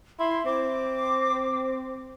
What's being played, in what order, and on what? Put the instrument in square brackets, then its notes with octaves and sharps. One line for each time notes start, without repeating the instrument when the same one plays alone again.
[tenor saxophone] E4 [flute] C6
[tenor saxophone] C4 [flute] D6